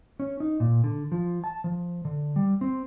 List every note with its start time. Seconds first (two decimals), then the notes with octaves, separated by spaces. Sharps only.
0.20 C#4
0.40 D#4
0.60 A#2
0.84 D3
1.12 F3
1.44 A5
1.64 F3
2.05 D3
2.36 G3
2.61 C4